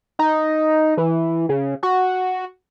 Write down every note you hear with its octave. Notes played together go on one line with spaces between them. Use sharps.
D#4
E3
C#3
F#4